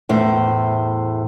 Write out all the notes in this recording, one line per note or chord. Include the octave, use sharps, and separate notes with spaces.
E2 A2 C5